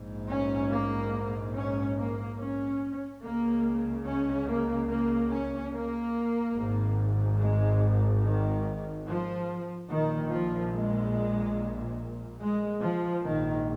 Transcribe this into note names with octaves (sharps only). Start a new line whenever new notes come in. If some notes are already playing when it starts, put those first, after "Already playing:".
Already playing: A#1 G#2
C#4
A#3
C#4
A#3
C#4
C#2 C#3 A#3
C#4
A#3
A#3
C#4
A#3
G#1 G#2
G#3
D#3
F3
A#1 A#2 D#3
F3
G#3
G#3
F3
A#1 G#2 D#3